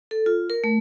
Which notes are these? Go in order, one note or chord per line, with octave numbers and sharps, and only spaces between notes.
A4
F4
A#4
A3